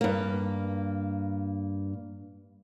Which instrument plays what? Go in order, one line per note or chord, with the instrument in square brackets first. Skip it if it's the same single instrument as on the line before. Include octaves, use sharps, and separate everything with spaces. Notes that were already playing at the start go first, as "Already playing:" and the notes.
[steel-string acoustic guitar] G2 A#3